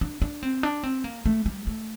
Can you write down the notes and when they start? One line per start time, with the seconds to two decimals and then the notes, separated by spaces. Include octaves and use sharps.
0.01 D4
0.22 D4
0.43 C4
0.63 D4
0.83 C4
1.04 A#3
1.26 A3
1.46 G3
1.67 A3